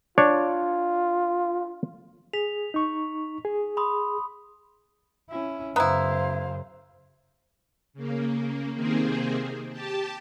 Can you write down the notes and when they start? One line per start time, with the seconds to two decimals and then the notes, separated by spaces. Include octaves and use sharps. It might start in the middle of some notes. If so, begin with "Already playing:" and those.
0.18 D4 F4 C#5 D5
2.33 G#4 B6 F7
2.74 D#4 C#6
3.45 G#4
3.77 B5 C6 D#6
5.30 C#4 E4
5.76 F#2 C#3 B3 E4 C5 F5 A#5
7.93 C#3 A#3
8.75 C3 D#3 A#3 C4 G#4
9.71 G4 A5